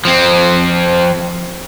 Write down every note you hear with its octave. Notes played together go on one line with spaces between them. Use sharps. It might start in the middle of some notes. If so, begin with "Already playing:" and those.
F3 C4